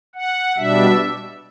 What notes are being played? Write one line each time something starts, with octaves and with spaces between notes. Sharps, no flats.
F#5
B2 G3 D4 E5